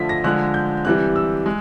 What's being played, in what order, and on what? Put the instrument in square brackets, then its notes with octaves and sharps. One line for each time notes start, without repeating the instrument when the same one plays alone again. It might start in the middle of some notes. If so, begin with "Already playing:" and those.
Already playing: [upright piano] D3 F3 A3 B6
A#6
D3 F3 G#3 F#6
G6
C3 E3 G3 F#6
E6
G#3